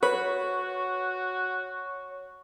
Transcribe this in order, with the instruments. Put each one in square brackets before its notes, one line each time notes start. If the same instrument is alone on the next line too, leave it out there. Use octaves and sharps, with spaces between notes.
[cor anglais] F#4 [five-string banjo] B4 [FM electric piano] C#5 C#6